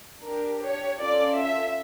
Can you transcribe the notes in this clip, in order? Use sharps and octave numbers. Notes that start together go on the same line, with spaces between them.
D4 G4 A#4
C#5
C#4 F4 A4 D5
E5